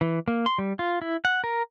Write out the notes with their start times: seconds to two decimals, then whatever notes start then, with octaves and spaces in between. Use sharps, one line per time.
0.01 E3
0.28 A#3
0.46 C6
0.58 G3
0.79 F4
1.02 E4
1.25 F#5
1.44 A#4